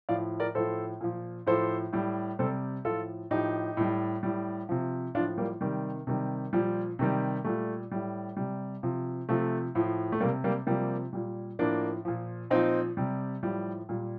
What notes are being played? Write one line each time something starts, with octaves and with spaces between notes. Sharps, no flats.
A2 F3 D5 F5
A#4 D5
A2 F3 A4 C5
A#2 F3
A2 F3 A4 C5
A2 G3
C3 G3 A4 C5
A2 F3 F4 A4
A2 F3 D#4 G4
A2 G3
A2 G3
C3 F3
A2 F3 D4 F4
G3 A#3
C3 D#3 G3
C3 D#3 G3
A#2 F3 G3
C3 D#3 G3
A#2 G3 A3
A2 G3
C3 G3
C3 F3
C3 F3 A3
A2 F3
A3
G3 A#3
C3
G3 A#3
C3 F3 G3 A#3
A#2 G3
A2 F3 A#3 D4
A#2 F3
A#2 F3 C4 D#4
C3 G3
A2 F3 G3
A#2 G3